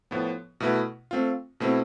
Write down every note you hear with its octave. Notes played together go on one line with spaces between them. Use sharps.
A2 F3 B3
B2 A3 E4 B4
A3 C4 F4
B2 A3 C4 E4